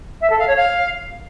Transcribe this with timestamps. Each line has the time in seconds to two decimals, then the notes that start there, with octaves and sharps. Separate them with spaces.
0.21 E5
0.30 A4
0.39 F5
0.47 C#5
0.56 F5